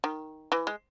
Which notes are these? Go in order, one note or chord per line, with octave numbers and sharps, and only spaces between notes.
D#3
E3
G#3